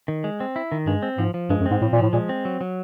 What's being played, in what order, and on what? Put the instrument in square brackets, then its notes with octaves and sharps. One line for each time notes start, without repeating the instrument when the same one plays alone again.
[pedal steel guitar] D#3
G#3
C4
E4
D#3
[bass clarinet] G2 [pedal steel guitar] G#3
[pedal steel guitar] C4
[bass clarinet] G#2 [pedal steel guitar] F3
[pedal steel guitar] F3
[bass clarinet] G2 [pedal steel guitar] G#3
[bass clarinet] F#2
[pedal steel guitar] C4
[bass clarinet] G#2
[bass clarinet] A2 [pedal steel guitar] F3
[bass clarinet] A#2
[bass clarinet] A2 [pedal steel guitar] F3
[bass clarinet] A#2 [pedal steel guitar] G#3
[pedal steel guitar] C4
F#3
F#3